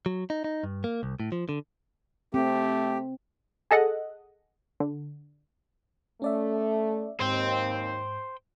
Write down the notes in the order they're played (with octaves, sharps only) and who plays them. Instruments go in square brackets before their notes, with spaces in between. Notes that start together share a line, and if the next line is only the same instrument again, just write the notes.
[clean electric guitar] F#3
D#4
D#4
G2
A#3
C2
A2
F3
D3
[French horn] A3 [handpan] C4 [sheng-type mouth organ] G4
[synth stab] G#4 A4 D#5 F#5
D3
[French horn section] A3 [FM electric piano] C#4 D5 E5
[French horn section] D#2 [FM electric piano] G#2 [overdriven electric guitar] C5 G5